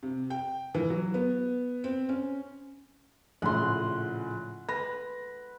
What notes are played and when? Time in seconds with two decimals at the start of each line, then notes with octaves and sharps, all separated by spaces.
0.03 C3
0.30 G5
0.75 E3
0.90 F#3
1.14 B3
1.84 C4
2.09 C#4
3.42 A#1 A2 C#3 F#5 C6
4.69 B4 A#6